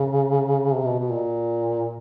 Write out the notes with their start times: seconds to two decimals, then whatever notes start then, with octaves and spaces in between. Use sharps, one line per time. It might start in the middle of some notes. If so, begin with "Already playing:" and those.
Already playing: C#3
0.74 C3
0.86 B2
0.99 B2
1.11 A#2